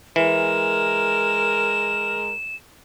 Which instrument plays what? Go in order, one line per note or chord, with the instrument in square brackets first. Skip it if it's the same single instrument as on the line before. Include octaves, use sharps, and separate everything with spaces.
[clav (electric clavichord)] E3 [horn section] G#3 A#4 [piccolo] E7